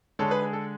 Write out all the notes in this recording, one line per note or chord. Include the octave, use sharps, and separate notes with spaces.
D3 G#3 A4 C#5
G#4 B4
G#4
A4